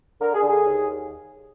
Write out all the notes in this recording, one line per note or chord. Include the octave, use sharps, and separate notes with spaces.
D3 A#4
G#4
D3
G#4
D#2